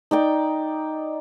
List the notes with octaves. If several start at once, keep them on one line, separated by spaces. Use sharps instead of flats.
D#4 D5 G5